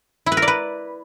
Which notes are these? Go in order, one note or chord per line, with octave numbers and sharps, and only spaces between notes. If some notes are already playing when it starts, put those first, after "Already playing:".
E4
B4
A#4
D5
B4